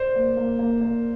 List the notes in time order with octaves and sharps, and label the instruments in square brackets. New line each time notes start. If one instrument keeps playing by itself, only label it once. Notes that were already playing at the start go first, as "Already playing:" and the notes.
Already playing: [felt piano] C5 D5
[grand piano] A#3
A#3
A#3
A#3